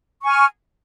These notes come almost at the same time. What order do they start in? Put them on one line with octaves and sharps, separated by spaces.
C#6 G#5 F6